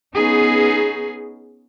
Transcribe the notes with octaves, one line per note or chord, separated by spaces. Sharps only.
B3 C#4 D#4 G#4